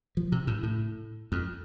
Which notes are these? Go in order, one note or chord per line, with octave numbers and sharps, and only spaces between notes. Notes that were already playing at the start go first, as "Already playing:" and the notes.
F3
C3
A2
A2
F2